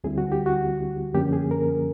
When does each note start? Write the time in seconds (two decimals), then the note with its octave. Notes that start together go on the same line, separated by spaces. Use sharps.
0.04 D2 D3 G3 C4 E4 G#4
0.18 F#4
0.32 G4
0.46 F#4
1.14 F#2 D3 F3 A#3 C#4 G4
1.33 G#4
1.51 A#4